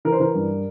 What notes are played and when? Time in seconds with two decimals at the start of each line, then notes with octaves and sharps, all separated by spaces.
0.05 E3 A#4
0.12 C5
0.20 E3 A#4
0.34 G2